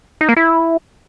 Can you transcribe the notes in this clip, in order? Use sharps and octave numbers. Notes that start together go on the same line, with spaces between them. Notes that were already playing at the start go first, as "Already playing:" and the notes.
D#4
A#3
E4